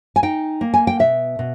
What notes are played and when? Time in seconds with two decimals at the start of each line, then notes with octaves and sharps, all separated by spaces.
0.16 G#5
0.23 D#4 G5
0.61 A#3
0.74 G#5
0.87 G5
0.99 B2 E5
1.39 B2